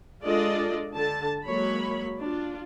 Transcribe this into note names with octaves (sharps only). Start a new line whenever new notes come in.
G#3 D4 F4 A4 D5 D#5
D3 A5
F#3 G#3 A#3 C#5 B5
D4 F4